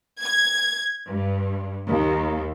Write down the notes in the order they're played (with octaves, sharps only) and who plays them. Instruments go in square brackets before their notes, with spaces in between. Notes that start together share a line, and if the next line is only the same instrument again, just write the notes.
[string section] G#6
G2
D#2